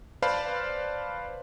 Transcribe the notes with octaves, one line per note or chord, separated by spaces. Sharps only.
B4 C5 D5 F5 A5 B5